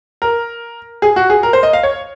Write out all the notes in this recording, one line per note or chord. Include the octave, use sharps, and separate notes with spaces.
A#4
G#4
F#4
G#4
A#4
C5
D#5
F5
C#5